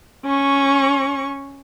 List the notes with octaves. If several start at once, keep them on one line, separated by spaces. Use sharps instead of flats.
C#4 C#6